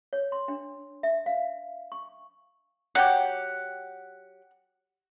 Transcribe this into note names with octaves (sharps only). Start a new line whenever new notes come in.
C#5
C6
D4
E5
F5
C#6
F#3 G4 F#5